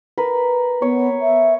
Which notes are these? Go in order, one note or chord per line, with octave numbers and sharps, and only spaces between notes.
A#4 B4
B3 C#5
E5